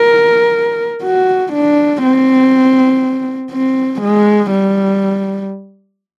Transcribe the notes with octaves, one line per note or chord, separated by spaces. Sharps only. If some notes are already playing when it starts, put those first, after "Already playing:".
Already playing: A#4
F#4
D4
C4
C4
G#3
G3